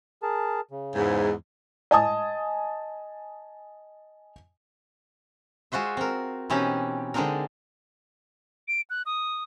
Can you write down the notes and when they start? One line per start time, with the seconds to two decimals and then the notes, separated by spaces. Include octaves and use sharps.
0.23 G#4 A#4 A5
0.71 C#3
0.95 E2 G#2
1.91 D#5 G#5 A5 D#6
5.72 G#3 F4 F#4 C5 E5
5.97 C4 A#4
6.50 B2 E3 C4 C#4 D#4 G4
7.14 D3 G#3 C4 D4 D#4 A#4
8.68 D7
8.90 F#6
9.06 D#6